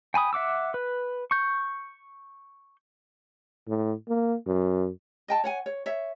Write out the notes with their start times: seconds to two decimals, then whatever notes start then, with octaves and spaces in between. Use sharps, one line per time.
0.14 G5 G#5 B5 D#6
0.33 E5 F#5 D6 E6
0.74 B4
1.31 C#6 G6
3.68 A2
4.08 A#3
4.47 F#2
5.28 D#5 G5 A5
5.44 C#5 F#5 G#5
5.66 C#5
5.86 C#5 E5